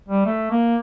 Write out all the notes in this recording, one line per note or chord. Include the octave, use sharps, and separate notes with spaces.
G3
A3
A#3